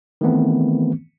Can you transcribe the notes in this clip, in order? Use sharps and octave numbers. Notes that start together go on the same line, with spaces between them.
D#3 E3 A3 B3 C4